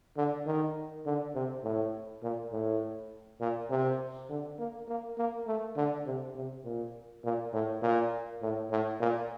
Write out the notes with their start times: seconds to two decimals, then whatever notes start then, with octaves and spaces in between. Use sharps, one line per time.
0.17 D3
0.46 D#3
1.06 D3
1.35 C3
1.64 A2
2.23 A#2
2.52 A2
3.40 A#2
3.70 C3
4.29 D3
4.58 A#3
4.88 A#3
5.18 A#3
5.47 A3
5.76 D3
6.06 C3
6.35 C3
6.64 A#2
7.24 A#2
7.53 A2
7.82 A#2
8.42 A2
8.71 A2
9.00 A#2